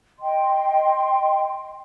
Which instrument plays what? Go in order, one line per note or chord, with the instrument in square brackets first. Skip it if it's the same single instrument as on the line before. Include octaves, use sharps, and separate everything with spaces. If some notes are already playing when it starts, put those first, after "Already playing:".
[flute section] D#5 G5 C6